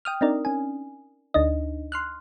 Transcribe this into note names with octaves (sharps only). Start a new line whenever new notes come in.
G5 D#6 F6
C4 D4 D#4 A#4 D5
C#4 G#5
D2 D4 D#4 D#5
C6 F6 F#6